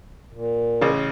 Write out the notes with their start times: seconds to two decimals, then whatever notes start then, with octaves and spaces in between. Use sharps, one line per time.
0.33 A#2
0.81 A1 C#3